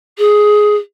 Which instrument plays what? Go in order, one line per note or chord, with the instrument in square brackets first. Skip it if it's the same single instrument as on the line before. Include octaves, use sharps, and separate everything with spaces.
[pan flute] G#4